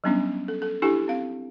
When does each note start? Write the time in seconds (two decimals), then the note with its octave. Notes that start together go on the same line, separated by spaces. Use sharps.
0.04 F#3 G3 B3 C#4 D4
0.48 A4
0.62 A4
0.82 D4 E4 G4 A4 G#5
1.08 C4 F5